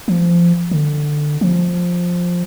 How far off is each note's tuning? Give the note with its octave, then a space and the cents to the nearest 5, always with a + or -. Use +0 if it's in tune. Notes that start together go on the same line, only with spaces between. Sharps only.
F3 -20
D3 +15
F3 +10